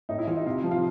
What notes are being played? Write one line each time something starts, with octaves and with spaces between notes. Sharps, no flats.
A2 D#4
E4
E3 F4
D#4
C3 F4
F3
F4